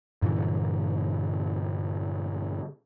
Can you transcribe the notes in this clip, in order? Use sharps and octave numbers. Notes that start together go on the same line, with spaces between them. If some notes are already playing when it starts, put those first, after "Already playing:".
G2 A#2 D3 E3